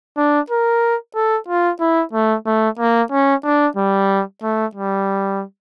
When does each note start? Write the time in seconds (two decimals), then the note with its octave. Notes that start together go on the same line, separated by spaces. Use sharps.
0.17 D4
0.50 A#4
1.16 A4
1.48 F4
1.81 E4
2.13 A3
2.46 A3
2.79 A#3
3.12 C#4
3.45 D4
3.77 G3
4.43 A3
4.75 G3